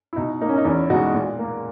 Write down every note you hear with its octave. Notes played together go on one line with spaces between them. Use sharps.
E4
B2 D#4
A#3 D#4
C#4
D#4
E2 C#4 E4
B2 G#3 D#4 F#4
A#2
A#3